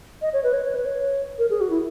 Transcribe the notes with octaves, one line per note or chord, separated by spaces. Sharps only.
D#5
C#5
B4
C#5
C#5
B4
C#5
A#4
G#4
F#4
E4